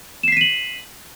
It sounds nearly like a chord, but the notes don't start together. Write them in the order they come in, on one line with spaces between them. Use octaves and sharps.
E7 C7 B6 D#7 F#7